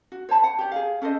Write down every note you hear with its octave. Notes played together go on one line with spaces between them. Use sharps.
F#4
C5 C#5 A5 B5
F#5
G4 C#5
G#4 C#5 F5
C#4 A4 C5 D#5